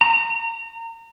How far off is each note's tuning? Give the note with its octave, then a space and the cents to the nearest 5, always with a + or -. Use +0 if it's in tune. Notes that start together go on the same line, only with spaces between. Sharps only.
A#5 -30